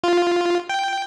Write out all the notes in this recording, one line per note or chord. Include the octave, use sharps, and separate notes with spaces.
F4
G5